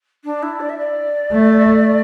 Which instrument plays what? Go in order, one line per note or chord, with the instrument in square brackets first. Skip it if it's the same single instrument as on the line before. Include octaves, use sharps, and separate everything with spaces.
[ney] D4
E4
D5
E5
D5
[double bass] A3